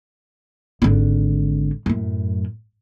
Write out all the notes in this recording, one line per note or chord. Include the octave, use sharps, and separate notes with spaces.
G#1 D3
F#2 A2